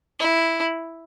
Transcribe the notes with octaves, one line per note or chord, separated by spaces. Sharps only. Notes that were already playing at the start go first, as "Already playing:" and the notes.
E4